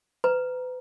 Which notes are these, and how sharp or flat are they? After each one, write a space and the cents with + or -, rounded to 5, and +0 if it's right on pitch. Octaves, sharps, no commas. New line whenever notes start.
B4 +35 A#5 +10